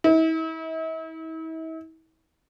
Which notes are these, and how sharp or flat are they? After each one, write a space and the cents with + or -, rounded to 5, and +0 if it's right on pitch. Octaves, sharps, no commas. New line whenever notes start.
E4 -40